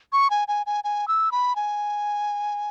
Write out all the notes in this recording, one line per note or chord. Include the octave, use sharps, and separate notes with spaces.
C#6
G#5
G#5
G#5
G#5
E6
B5
G#5